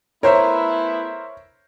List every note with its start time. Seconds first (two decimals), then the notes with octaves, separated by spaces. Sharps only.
0.23 A3 B3 E4 A#4 C5 C#5 E5